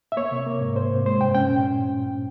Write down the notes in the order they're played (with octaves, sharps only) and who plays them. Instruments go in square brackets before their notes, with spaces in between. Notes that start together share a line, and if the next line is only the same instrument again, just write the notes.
[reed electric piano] E5
A#3 C#5
C3
A#3
G#2
A#3 C5
C3
G#3 C5
G2 G5
C#4 G5
A#2